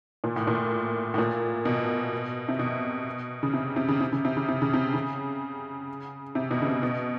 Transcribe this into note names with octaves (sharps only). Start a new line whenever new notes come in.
A#2
A2
A#2
A2
A#2
B2
C3
B2
C#3
C3
C3
C#3
C3
C#3
C3
C#3
C3
C#3
C3
C#3
C3
B2
C#3
C3
B2